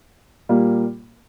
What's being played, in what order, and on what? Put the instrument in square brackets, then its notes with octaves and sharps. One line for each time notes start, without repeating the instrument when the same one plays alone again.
[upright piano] A#2 G3 A#3